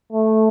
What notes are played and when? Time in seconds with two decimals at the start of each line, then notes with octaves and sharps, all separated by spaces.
0.12 A3